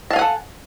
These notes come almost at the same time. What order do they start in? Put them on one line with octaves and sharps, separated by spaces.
A5 F5 G#5 F#5 A4